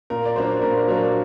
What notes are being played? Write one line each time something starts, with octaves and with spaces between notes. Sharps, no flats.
A#2 A#4
D5
F#3 A#3 D4 C5
A#2 A#4
F#3 A#3 D4 A#4